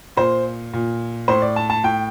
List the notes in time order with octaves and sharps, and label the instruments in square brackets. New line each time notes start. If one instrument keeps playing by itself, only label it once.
[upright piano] A#2 C5
A#2
A2 C5
D5
A5
A5
A2 G5